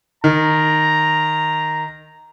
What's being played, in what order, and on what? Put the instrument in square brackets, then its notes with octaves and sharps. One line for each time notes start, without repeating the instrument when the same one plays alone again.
[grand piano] D#3 [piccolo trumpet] A#5